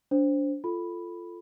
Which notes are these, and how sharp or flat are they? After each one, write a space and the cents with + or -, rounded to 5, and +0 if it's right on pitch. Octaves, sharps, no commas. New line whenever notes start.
D4 -30 C5 +0
F4 -10 A4 +0 B5 +0